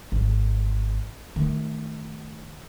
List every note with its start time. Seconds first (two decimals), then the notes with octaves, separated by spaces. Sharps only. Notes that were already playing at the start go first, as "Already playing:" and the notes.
0.12 G#1
1.36 D#3 A3